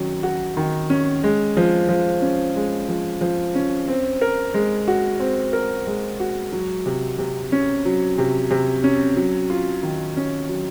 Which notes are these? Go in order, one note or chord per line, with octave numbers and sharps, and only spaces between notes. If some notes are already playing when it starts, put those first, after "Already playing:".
Already playing: D#3 F#3 C#4
F#4
D#3
C#4
G#3
F3
F3
C#4
G#3
F3
F3
C#4
C4
A#4
G#3
F#4
C4
A#4
G#3
F#4
F#3
C3
C3
C#4
F#3
C3
C3
C#4
F#3
F4
D#3
C#4
F#3